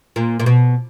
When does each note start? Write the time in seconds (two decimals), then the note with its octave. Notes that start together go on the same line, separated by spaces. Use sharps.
0.16 A#2
0.40 A#2
0.46 B2